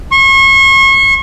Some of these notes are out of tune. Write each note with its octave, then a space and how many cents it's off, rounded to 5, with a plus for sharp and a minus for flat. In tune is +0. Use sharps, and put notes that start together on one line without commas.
C#6 -35